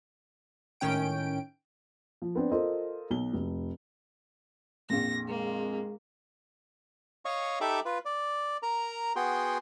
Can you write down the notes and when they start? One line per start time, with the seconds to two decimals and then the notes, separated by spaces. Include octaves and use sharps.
0.80 G#1 A2 D#3 C#4 G5 D7
2.22 F3
2.35 B3 C4 D4
2.52 F4 A4 A#4 C5 D#5
3.10 B1 G7
3.33 F1
4.90 A#1 F2 A#2 A#6
5.29 G#3 A#3
7.25 C#5 D#5 F5 C#6
7.61 D#4 G4 A4 E5 B5 D6
7.85 F4 B4
8.05 D5
8.63 A#4 A#5
9.16 B3 F#4 G#4 G5 C6